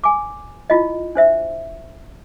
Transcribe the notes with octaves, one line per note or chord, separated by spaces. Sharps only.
G#5 D6
E4 F4 D#5
D4 C5 E5